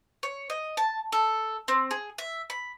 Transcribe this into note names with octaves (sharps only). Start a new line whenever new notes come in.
C#5
D#5
A5
A4
C4
G#4
E5
B5